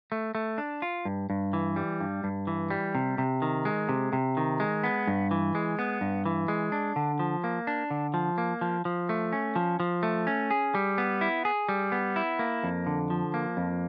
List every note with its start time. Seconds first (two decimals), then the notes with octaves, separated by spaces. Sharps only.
0.12 A3
0.35 A3
0.58 D4
0.82 F4
1.05 G2
1.30 G2
1.53 E3
1.76 G3
2.00 G2
2.24 G2
2.47 E3
2.71 G3
2.95 C3
3.18 C3
3.42 D#3
3.65 G#3
3.89 C3
4.13 C3
4.37 D#3
4.60 G#3
4.84 B3
5.07 G2
5.31 E3
5.55 G#3
5.79 B3
6.01 G2
6.26 E3
6.48 G#3
6.72 D4
6.96 D3
7.19 F3
7.44 A#3
7.67 D4
7.91 D3
8.14 F3
8.38 A#3
8.61 F3
8.85 F3
9.09 A3
9.32 C#4
9.56 F3
9.80 F3
10.03 A3
10.27 C#4
10.51 G#4
10.75 G3
10.98 B3
11.21 E4
11.45 G#4
11.69 G3
11.92 B3
12.16 E4
12.39 A#3
12.63 F2
12.87 D3
13.10 F3
13.34 A#3
13.57 F2